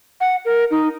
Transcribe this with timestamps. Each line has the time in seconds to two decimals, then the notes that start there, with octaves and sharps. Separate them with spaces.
0.21 F#5
0.45 A#4
0.71 D#4